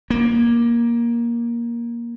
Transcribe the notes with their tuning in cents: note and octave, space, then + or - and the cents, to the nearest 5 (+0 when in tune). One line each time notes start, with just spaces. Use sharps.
A#3 +15